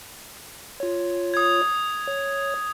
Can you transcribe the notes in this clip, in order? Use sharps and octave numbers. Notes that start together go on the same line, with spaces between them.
F4 C#5
D#6 G#6
C#5